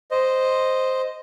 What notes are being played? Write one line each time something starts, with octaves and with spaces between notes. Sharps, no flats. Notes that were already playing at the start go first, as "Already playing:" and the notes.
C5 D#5